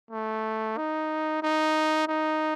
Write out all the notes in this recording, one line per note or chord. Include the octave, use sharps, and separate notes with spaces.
A3
D#4
D#4
D#4